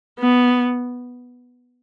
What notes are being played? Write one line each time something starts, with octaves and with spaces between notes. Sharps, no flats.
B3